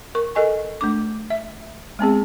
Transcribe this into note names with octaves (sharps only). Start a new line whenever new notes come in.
A#4 C#6
A4 A#4 D#5 G#5 C#6
A3 D4 D6
E5
G#3 B3 C4 G#4